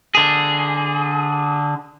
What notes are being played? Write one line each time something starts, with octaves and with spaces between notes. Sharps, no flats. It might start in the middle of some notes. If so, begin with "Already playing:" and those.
D3 G#4